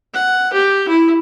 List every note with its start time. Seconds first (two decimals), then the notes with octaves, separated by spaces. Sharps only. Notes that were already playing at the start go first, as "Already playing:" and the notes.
0.14 F#5
0.53 G4
0.89 E4